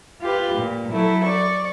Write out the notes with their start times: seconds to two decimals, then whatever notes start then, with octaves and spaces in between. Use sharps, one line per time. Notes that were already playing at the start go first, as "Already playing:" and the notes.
0.21 F4 G4 B4
0.54 A#2
0.92 F#3 A3 E4
1.24 D5 C#6